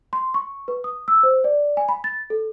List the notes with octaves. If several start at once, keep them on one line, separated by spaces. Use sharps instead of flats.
C6
C#6
B4
D#6
E6
C5
D5
G#5
B5
A6
A4